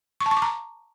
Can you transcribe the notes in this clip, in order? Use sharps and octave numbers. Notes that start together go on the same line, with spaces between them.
C#6
A5
C#6
D6
A#5